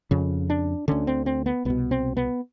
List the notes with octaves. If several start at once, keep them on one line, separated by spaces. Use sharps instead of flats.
F2 C#3
D4
D2 D3 C#4
C4
C4
B3
C2 B2 B3
C4
B3